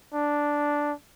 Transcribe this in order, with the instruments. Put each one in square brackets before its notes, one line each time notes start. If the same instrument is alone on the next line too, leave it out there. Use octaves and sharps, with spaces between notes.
[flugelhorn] D4